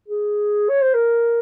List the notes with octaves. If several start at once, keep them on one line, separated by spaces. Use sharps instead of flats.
G#4
C#5
C5
A#4